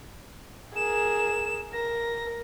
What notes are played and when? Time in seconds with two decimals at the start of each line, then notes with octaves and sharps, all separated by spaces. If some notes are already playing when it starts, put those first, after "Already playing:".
0.76 G#4 A#4 E7
1.72 A#4 A#6